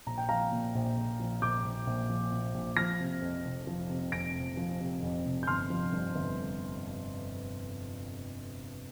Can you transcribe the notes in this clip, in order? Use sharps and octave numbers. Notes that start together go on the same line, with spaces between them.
A#1 A#5
G5
F3 F5 A#5
A#2
A#1
A#1
F3
A#2 D6 G6
A#1
A#1
F3
A#2
A#1
F3 F6 A#6
C3
F2
F1
F3
C3
F2 A#6 D7
F1
F3
C3
F2
F1
G6
G1 C6 F6
F3
G2
G1